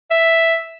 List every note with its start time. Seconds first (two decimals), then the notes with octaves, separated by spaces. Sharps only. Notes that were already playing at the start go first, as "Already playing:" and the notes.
0.11 E5